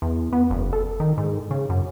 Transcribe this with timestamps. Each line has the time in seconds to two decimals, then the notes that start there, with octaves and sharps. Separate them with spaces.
0.02 E2
0.33 B3
0.50 F#1
0.73 A4
1.00 D#3
1.18 G#2
1.51 C#3
1.70 F#2